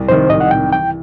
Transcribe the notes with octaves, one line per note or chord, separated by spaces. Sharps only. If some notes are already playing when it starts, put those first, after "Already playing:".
Already playing: C2
C3 D#3 C5
C2 D#5
F#5
C3 D#3 G5
E3 G5